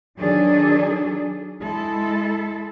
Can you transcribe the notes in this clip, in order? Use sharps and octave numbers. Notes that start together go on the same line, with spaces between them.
D#3 F#3 D4 G#4 A4
G#3 E4 A4